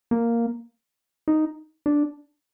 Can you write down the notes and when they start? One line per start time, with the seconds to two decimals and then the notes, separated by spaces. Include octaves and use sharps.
0.11 A#3
1.28 D#4
1.86 D4